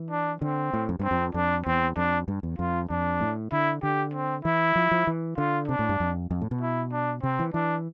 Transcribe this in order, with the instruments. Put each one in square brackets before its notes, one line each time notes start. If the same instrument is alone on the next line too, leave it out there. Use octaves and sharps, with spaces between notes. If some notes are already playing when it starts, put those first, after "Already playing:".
Already playing: [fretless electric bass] E3
[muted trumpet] D4
[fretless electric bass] D3 [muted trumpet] C4
[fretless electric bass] A2
F2
[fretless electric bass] G2 [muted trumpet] C4
[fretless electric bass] F2
[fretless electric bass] F2 [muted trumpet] D4
[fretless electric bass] E2 [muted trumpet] C4
[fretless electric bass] F2 [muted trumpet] D4
[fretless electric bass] G2
E2
[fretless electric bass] F2 [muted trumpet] F4
[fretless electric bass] F2 [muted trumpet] D4
[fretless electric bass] A2
[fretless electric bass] D3 [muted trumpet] E4
[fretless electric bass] D3 [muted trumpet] G4
[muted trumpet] C4
[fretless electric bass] E3 [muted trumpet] E4
[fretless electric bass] F3
F3
E3
[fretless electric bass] D3 [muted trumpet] F4
[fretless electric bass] C3 [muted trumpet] D4
[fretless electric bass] A2
G2
F2
F2
A2
B2
[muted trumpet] E4
D4
[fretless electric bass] C3 [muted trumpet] C4
[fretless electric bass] E3
[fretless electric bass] E3 [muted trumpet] D4